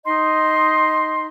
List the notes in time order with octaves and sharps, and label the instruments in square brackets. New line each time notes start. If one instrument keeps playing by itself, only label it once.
[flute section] D#4 D#5 C6